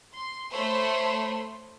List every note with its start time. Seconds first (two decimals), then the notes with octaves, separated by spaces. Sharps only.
0.13 C6
0.52 A3 C5 C#5 B5 C6